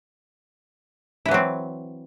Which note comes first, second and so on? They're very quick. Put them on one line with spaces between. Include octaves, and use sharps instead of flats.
E4 E3 F#3 C4